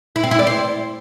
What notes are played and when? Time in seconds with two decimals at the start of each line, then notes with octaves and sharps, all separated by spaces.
0.16 E4
0.23 C4
0.31 E4
0.39 D5
0.47 C5